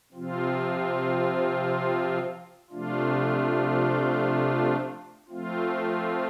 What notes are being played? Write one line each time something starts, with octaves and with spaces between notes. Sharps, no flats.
C3 F3 C4 F4
C3 F3 A3 D4 F4
F3 A3 C4 F4